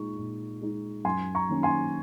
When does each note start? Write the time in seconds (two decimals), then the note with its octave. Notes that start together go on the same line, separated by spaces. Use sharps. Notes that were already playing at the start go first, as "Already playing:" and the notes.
Already playing: A#2 G#3 D#4 C#6
0.18 A#2
0.62 G#3 D#4
1.05 F#2 G#5 C6
1.35 A#5 C#6
1.50 D#3 A#3 C#4
1.63 G#5 C6